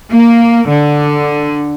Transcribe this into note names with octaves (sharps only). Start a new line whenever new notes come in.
A#3
D3